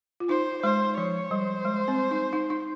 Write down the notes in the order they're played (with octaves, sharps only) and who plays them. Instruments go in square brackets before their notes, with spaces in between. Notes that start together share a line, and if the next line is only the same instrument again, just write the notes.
[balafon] F4
[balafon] D#4 [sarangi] C5
[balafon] G#3 [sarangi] C5
[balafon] F3 [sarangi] C#5
[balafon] G3 [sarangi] C5
[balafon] G#3
C4
D#4
D#4
D#4